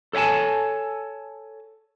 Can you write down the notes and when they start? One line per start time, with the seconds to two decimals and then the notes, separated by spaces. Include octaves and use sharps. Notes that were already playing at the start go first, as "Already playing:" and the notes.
0.13 A4 C#5 E5 G#5 A5